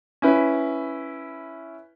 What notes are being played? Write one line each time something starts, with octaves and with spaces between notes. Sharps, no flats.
C#4 E4 B4